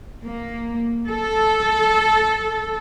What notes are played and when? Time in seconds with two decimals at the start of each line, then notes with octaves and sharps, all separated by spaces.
0.24 A#3
1.09 A4